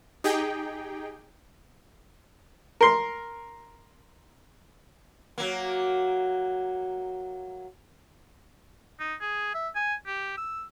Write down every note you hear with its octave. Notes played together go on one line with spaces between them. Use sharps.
D#4 G4 G#4 G5
A#4 C6
F#3 A#3
D#4
G#4
E5
G#5
G4
E6